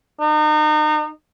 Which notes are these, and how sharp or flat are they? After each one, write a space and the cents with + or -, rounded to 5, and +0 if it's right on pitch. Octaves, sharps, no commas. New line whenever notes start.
D#4 -35